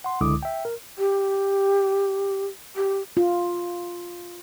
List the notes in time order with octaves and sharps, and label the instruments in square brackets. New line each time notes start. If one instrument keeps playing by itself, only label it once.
[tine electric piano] F#5 C6
C#2 D3 G#3 E4 D6 D#6
E5 G5
A#4
[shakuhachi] G4
G4
[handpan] F4